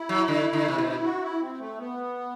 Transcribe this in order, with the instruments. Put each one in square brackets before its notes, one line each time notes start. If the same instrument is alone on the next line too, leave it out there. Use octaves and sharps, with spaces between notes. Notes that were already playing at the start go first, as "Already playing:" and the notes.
Already playing: [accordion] E4
[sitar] F#3
D3
D3
C3
B2
[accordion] F#4
E4
C4
A3
B3